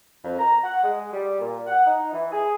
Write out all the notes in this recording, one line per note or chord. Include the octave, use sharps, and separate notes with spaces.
F2
A#5
F#5
G#3
G3
A#2
F#5
D#4
E3
G#4